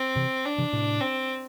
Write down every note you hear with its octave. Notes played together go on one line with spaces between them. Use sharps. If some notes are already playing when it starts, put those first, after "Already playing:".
Already playing: C4
C3 E3
D4
C3 E3
A2 C3
C4